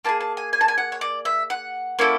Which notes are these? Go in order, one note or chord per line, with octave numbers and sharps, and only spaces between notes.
A#3 D#4 G#4 A5
A5
G#5
G#5
A5
G#5
F#5
C#5
D5
E5
F#5
A#3 C#4 E4 A4